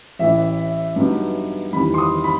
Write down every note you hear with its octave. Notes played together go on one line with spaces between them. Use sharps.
A1 A2 E3 E5
G2 F#3 B3 D#4
E2 D#3 G3 B5
C6
D#6
B5